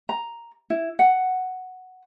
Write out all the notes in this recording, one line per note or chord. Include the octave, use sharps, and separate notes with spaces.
A#5
E4
F#5